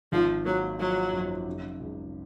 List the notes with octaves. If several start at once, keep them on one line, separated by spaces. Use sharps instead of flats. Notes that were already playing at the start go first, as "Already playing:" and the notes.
G#1 F3
F#3 A#3
F3 F#3
F#2
C#3
C#2